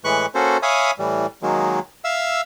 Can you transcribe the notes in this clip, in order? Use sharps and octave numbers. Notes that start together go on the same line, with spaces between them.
A2 E3 G#3 B4 C#6 F#6
A#3 C#4 F#4 A4 C5
C#5 E5 F5 G#5 B5 D#6
A2 E3 G3
D#3 F#3 G#3 A#3
E5 F5 E6